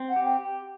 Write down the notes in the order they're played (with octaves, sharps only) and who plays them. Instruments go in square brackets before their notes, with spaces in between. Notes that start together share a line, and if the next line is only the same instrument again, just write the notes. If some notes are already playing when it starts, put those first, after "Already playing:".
Already playing: [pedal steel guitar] C4
[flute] F#5
[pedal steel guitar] G4
[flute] G5